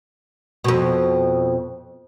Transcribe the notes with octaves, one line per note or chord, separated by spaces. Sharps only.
F2 B2